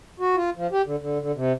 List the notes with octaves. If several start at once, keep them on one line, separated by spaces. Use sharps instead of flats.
F#4
F4
F3
G4
D3
D3
D3
C3